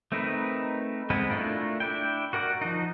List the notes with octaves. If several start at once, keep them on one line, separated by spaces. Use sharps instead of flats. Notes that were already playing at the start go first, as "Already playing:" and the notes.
A3 C4 D#4 A#4 B4
G#3 B3 C4 B4
A3 D4 E4 F4 A#4
D4 E4 G5
F#4 A#4 D5 F#5
F3 D#4